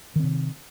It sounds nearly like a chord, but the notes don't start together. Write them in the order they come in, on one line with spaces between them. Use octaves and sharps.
D#3 C4 C3